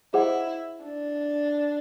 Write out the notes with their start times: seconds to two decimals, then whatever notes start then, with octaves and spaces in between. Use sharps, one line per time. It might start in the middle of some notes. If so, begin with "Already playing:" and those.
0.14 E4 G#4 C5 D#5 F#5
0.83 D4